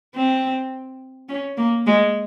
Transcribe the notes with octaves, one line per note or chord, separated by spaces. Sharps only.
C4
C#4
A#3
G#3